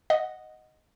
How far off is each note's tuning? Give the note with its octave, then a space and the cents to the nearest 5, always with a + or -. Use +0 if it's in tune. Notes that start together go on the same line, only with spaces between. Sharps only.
D#5 +0 F#5 +0